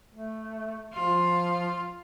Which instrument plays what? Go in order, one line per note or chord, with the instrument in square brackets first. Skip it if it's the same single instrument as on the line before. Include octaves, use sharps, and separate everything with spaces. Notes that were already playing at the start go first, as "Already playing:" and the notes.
[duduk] A3
[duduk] F3 [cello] F4